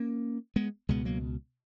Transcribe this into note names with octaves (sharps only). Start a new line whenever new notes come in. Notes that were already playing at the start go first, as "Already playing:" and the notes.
Already playing: A#3 C#4
G#3 B3
C#2 B2 G#3 B3
F#3 A#3